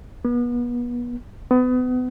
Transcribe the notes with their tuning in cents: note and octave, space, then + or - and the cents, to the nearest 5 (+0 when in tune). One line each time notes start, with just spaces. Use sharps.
B3 -35
B3 +30